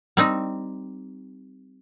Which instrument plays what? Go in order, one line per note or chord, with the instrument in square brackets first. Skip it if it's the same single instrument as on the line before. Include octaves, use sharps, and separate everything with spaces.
[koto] G3 C4 D#4